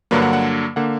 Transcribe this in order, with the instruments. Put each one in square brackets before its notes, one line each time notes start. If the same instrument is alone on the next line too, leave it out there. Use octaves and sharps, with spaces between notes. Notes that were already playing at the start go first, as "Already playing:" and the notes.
[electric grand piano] G2 D3 F#3 A#3 B4
F#5
F#5
D3 A#3 F#5